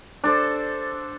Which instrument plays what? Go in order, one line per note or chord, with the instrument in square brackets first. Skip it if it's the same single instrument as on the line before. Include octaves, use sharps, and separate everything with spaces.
[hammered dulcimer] D4 A4 C5